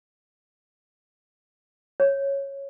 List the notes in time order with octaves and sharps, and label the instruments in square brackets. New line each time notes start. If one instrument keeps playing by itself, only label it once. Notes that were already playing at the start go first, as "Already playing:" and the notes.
[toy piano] C#5